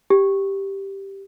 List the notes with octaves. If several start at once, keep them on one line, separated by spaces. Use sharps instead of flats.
G4